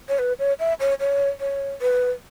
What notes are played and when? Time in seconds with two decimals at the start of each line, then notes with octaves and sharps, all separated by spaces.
0.09 C#5
0.19 B4
0.39 C#5
0.59 E5
0.80 C#5
1.00 C#5
1.41 C#5
1.82 B4